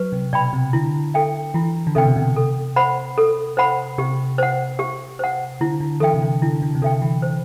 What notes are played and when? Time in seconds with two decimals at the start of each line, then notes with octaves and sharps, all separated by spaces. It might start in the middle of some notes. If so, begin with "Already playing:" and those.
Already playing: F#3 B4
0.12 C3
0.33 B2 D5 G5 B5
0.53 C3
0.73 D3 E4
1.14 A4 E5 G5
1.54 E3 E4
1.87 D3
1.95 C3 A4 E5 G5
2.06 B2
2.16 C3
2.36 A4
2.76 C5 F#5 B5
3.18 A4
3.57 C5 F#5 B5
3.98 C3 G4
4.38 C5 F#5
4.79 G4
5.19 C5 F#5
5.61 D3 E4
5.80 D3
6.00 E3 A4 E5 G5
6.14 C3
6.22 D3
6.42 D3 E4
6.62 D3
6.75 C3
6.82 D3 A4 E5 G5
7.02 E3
7.22 C5